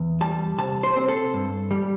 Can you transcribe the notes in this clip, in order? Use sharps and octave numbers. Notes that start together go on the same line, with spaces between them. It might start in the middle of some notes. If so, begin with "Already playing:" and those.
Already playing: E2
G3 A5
C3 A5
C5
C4 C5
A4
G2
G3